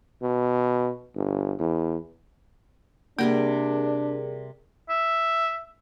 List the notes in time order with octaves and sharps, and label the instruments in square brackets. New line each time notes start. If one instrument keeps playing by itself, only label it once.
[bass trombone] B2
G1
E2
[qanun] C3 G3 G5 [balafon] A#3 [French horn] D4 [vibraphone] G#4 A#4 D5
[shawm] E5